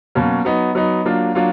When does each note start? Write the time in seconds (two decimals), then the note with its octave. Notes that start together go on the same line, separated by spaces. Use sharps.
0.15 B2 F#3 A#3 C#4
0.45 F#3 B3 D#4
0.75 F#3 B3 D#4
1.05 F#3 A#3 D4 F4
1.35 F#3 A#3 D4 F4